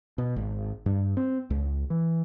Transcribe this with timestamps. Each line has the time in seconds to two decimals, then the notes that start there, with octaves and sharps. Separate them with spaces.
0.18 B2
0.36 G#1
0.86 G2
1.17 C4
1.50 C#2
1.90 E3